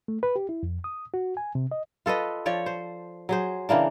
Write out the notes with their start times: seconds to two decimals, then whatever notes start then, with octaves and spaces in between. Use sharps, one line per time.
0.08 A3
0.23 B4
0.36 G4
0.49 E4
0.63 F2
0.84 D#6
1.14 F#4
1.37 G#5
1.55 C3
1.71 D#5
2.06 F4 A4 B4 D#5
2.46 F3 C#5 D5
2.66 C5
3.29 F#3 G#4 C5
3.69 C#3 E3 A#3 D4